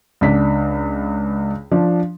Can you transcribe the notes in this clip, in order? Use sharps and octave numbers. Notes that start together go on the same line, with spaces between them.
C#2 D4 B6
F3 D4